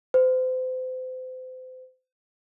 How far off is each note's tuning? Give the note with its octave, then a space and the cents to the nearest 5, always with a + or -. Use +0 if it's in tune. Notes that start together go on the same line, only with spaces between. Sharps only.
C5 -35